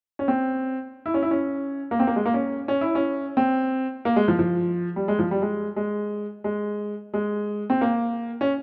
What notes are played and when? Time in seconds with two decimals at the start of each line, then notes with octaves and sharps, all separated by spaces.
0.19 C#4
0.28 C4
1.06 E4
1.14 C#4
1.23 E4
1.31 C#4
1.91 A#3
1.99 C4
2.07 A#3
2.16 G#3
2.26 A#3
2.34 C#4
2.68 C#4
2.81 E4
2.95 C#4
3.37 C4
4.05 A#3
4.16 G#3
4.28 F3
4.39 F3
4.96 G3
5.08 G#3
5.19 F3
5.31 G3
5.42 G#3
5.76 G#3
6.44 G#3
7.14 G#3
7.70 C4
7.81 A#3
8.41 C#4